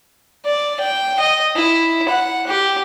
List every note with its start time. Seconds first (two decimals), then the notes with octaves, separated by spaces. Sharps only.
0.45 D5
0.80 G5
1.20 D#5
1.56 E4
2.09 F#5
2.47 G4